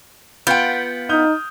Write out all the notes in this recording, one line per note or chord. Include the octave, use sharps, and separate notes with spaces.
B3 F4 G5 G6 D7
D#4 D#6 F6 G6